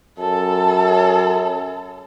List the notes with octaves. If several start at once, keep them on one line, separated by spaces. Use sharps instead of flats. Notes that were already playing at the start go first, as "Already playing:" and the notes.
F#2 A4